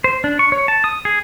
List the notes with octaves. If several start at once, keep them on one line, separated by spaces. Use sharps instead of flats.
C5
D4
C#6
C#5
A5
D#6
G#4